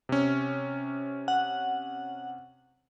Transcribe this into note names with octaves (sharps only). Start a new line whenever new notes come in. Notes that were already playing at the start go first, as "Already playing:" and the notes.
C3 C#4
F#5